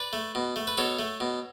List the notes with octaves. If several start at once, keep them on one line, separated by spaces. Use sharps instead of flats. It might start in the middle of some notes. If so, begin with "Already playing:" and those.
Already playing: B4 D5
A3
B2
A3
B4
B2 A4 C#5
A3
B2